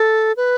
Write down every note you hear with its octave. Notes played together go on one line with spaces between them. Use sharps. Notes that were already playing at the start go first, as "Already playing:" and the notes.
Already playing: A4
B4